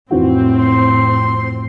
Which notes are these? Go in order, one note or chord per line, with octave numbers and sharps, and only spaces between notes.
F2 A2 E3 C4 F#4
C6